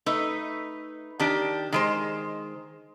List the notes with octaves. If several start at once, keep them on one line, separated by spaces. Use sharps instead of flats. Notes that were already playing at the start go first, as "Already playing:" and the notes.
A3 D#4 B4
D#3 D4 G4
D#3 G#3 C5